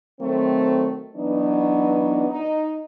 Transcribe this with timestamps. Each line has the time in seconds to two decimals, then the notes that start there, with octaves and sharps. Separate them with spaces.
0.20 D#3 F#3 A3 C4
1.16 E3 F#3 B3 D4 D#4
2.30 D#4